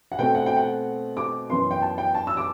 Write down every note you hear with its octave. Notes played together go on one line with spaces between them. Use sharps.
F#5
B2 A3 C4 G5
F#5
G5
F#5
D6
F#2 E3 B3 C6
G5
A5
G5
A5
E6
D6